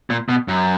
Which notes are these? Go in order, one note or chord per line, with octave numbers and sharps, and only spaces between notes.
A#2
B2
F#2